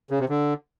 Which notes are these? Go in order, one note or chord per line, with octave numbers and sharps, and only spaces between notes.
C#3
C3
D3